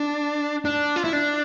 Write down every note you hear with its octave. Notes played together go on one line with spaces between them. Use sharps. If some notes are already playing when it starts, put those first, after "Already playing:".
Already playing: D4
D4
F4
E4
D4